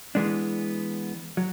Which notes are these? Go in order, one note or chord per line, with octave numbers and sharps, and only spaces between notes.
E3 G#3 B3 D4
F#3